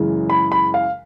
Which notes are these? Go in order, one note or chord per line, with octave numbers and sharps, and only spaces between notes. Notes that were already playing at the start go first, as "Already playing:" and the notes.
Already playing: F#2 C#3 E3 G#3
B5
B5
F5